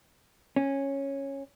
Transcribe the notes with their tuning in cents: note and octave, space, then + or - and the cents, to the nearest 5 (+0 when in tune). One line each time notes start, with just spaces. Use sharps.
C#4 -10